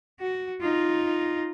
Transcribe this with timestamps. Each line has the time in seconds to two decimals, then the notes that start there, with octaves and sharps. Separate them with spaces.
0.20 F#4
0.62 D#4 F4